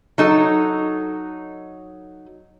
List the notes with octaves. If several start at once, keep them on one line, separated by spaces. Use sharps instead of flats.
F#3 D#4 A4